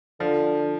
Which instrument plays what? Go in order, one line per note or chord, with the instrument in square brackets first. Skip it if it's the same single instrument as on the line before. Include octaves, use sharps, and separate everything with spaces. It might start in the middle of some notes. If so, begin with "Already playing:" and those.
[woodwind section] D3 [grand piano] F3